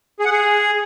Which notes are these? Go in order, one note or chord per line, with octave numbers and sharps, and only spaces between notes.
G#4
F#5
G#4